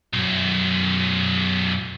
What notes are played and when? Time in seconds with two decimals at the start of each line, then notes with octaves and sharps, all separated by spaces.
0.13 B1 F#2